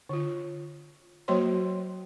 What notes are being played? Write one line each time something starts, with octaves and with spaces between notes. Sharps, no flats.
D3 F4
F#3 A#3 F#4 C5 C#5 C6